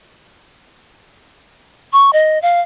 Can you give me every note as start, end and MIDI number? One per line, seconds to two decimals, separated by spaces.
1.93 2.11 85
2.13 2.41 75
2.42 2.61 77